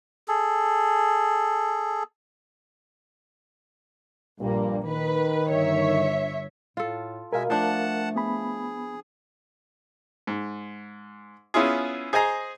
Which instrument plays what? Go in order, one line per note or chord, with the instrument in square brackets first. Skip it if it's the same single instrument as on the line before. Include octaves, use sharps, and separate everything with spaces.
[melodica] G#4 A4
[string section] A#1 A#3 [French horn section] G2 A#2 G3
[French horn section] D#3 [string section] B4
[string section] G1 C#5 E5
[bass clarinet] A2 [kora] F4 A4
[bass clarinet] B2 [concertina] G#3 E5 G#5 [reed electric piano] A#4 F5
[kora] F3 D4 [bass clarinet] A3 [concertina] F#5 A5
[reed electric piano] B3 B5 [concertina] G#4
[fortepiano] G#2
B3 C#4 E4 F4 G#4
G#4 C5 D#5 G#5 A#5